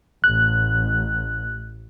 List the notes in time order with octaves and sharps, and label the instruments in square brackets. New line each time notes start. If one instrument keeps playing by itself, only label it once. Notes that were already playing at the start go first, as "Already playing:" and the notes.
[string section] A1 [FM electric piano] F#6